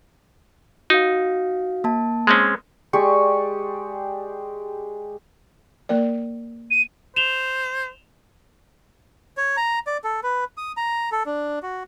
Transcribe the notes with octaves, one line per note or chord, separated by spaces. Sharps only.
D#4 F#4 F5
A#3 A5
G#3 C4 C#4
G#3 G4 D5 C#6
A#3 A#4 D5
D#7
C5 E7 F7 G7
C#5
A#5
D5
A4
B4
D#6
A#5
A4
D4
F#4